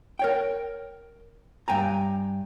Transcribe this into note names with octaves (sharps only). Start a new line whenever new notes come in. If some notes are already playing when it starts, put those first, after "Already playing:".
A#4 C#5 G5
G2 G5 G#5 A#5